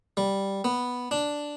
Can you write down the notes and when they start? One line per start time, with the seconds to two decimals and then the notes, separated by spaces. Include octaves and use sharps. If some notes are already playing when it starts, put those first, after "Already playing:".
0.17 G3
0.64 B3
1.11 D4